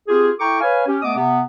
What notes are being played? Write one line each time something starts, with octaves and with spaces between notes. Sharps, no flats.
C4 F4 G4 G#4
E4 A4 G5 A#5 C#6 D6
B4 C#5 F5 G#5
C#4 G4
A3 B3 D#5 D6 D#6
C3 B3